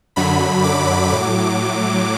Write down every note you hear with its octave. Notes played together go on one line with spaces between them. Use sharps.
F#2 D3 F#3 B5
D6
A2 F#3 D6